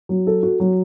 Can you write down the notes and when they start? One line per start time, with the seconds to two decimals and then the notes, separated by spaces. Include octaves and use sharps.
0.09 F#3
0.27 A4
0.43 F#4
0.60 F#3